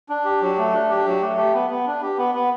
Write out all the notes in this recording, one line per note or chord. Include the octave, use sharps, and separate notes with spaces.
D4
G4
F#3
A3
D4
G4
F#3
A3
G4
B3
B3
D4
G4
B3
B3